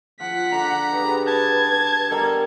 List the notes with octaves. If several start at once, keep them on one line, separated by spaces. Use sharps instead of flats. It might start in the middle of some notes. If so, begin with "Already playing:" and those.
F3 F#5 B6
D3 A#5
G4 G#4 B4
A5 G#6
B2 G3 A4 A#4 A#5